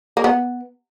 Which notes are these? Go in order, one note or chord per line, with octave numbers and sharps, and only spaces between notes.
A#3
B3